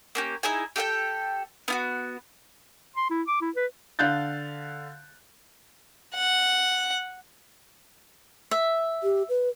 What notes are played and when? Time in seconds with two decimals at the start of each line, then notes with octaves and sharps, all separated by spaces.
0.15 A#3 C#4 G4
0.43 D#4 E4 G#4 G#5
0.76 G4 A4 F#5 G5
1.68 B3 F4 F#4
2.96 C6
3.10 E4
3.27 D6
3.41 E4
3.56 B4
3.99 D3 F5 F#6 G6 A6
6.15 F#5
8.51 E5
9.03 G4
9.29 B4